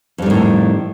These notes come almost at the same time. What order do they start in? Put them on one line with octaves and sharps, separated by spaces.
F2 G3 D#3 A2